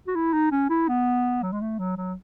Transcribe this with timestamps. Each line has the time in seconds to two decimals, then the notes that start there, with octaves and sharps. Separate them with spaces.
0.07 F#4
0.15 E4
0.33 D#4
0.52 C#4
0.69 E4
0.89 B3
1.42 F#3
1.52 G#3
1.61 A3
1.79 F#3
1.97 F#3